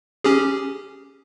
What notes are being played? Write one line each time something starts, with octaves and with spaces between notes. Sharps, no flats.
C#4 G4 G#4